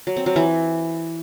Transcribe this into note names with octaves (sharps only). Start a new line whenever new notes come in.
F#3
C4
F#3
E3